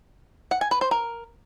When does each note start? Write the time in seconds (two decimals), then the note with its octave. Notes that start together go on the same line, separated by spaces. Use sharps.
0.51 F#5
0.61 G#5
0.71 B4
0.81 C5
0.91 A#4